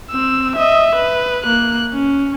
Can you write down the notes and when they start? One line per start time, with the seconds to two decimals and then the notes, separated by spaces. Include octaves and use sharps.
0.11 C4 E6
0.56 D#5 E5
0.96 B4
1.44 A#3 F#6
1.93 C#4